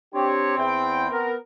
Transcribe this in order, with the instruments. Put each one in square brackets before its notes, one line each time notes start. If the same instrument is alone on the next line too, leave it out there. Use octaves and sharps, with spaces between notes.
[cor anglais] C4 [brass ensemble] D4 G4 C#5
[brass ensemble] E2 E4 G5
B3 A#4